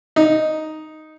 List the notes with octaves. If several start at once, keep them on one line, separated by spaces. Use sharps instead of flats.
D#4